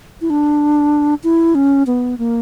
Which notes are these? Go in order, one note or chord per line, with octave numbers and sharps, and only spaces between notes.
E4
D4
E4
C#4
B3
A#3